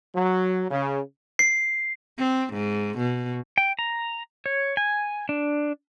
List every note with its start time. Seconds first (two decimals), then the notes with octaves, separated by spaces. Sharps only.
0.14 F#3
0.70 C#3
1.39 C7
2.18 C4
2.53 G#2
2.98 B2
3.58 G5
3.79 A#5
4.46 C#5
4.77 G#5
5.29 D4